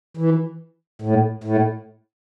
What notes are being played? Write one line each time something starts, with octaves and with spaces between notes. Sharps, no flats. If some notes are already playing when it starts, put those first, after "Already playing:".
E3
A2
A2